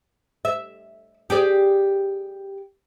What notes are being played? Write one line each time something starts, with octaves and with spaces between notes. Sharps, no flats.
E5
G4 G#4 D5